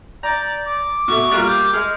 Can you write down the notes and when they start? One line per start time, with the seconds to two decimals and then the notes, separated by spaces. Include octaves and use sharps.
0.23 D5 A#5 G6
0.66 D6
1.08 B2 A3 C#6
1.31 G3 A#3 F4 F#6
1.47 D6 G6
1.73 G#3 G#4 F6